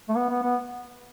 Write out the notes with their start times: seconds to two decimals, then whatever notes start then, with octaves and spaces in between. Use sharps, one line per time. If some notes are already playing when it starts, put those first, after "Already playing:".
0.09 A3
0.16 B3
0.30 B3
0.43 B3